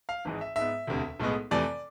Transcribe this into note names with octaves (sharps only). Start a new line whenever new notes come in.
F5
G#1 G#2 E3 G#3
E5
G#2 G#3 B3 E5
E1 D2 C3
B1 A2 G#3 B3
F2 C3 E3 A3 D5